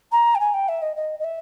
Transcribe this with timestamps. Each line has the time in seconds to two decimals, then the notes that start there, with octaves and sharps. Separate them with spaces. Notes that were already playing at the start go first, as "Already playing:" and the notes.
0.11 A#5
0.35 G5
0.39 G#5
0.53 G5
0.68 E5
0.82 D#5
0.96 D#5
1.19 D#5
1.24 E5